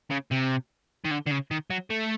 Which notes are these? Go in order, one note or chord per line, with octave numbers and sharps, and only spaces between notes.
C#3
C3
D#3
D3
D3
C#3
D#3
F#3
A3